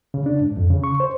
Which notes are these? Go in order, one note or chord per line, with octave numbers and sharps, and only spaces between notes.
C#3
D4
G#2
F2
C#3
C#6
C5